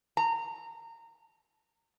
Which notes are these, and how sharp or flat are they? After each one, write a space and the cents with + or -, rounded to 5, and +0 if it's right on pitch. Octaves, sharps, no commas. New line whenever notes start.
A#5 -20